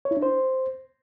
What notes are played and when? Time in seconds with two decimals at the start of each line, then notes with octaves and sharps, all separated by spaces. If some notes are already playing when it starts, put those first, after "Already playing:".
0.05 C#5
0.11 E4
0.17 D4
0.22 C5